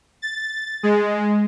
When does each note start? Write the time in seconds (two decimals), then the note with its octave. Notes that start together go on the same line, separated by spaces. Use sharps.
0.22 A6
0.83 G#3